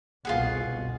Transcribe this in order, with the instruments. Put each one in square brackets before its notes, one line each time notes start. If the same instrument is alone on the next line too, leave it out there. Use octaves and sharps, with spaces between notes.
[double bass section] G1 C2 B2 [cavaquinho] F4 G#4 F#5